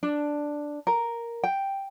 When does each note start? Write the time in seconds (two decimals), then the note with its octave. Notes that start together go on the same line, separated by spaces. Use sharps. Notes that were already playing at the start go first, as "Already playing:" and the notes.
0.03 D4
0.87 A#4
1.44 G5